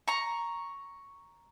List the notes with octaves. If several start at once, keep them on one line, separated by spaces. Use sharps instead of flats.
A#5 C#6